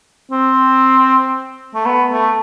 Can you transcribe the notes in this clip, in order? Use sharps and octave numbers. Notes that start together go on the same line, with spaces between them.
C4
A3
B3
A3